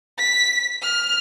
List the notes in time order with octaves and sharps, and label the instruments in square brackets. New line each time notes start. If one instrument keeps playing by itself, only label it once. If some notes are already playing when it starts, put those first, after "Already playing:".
[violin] B6
F6